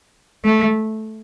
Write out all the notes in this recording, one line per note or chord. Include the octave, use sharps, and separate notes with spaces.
A3